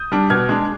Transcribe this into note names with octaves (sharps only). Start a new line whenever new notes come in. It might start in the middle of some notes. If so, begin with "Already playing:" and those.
Already playing: D#6 G6
G3 D4
B2 F6 G#6
G#3 D4